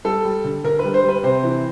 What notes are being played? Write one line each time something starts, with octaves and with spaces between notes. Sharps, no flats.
G3 A4
G3
D3
D3 A#4
G3 B4
C5
G3
B4
C3 C5
E3